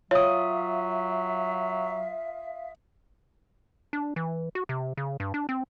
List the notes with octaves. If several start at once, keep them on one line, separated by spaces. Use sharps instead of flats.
F#3 F4 C#5 E5 F5 D#6
D4
E3
F#4
C3
C#3
G2
D4
C4